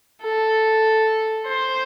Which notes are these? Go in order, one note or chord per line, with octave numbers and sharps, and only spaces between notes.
A4
C5